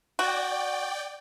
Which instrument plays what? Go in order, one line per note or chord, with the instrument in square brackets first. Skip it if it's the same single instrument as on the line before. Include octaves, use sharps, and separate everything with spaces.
[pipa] F#4 [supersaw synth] D5 G5